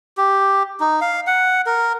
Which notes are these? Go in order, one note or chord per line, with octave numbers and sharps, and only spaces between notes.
G4
D#4
F5
F#5
A#4